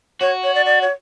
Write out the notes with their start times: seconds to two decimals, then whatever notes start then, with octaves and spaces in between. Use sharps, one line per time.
0.21 F#4 C#5
0.44 C#5
0.55 D5
0.66 D5
0.82 C#5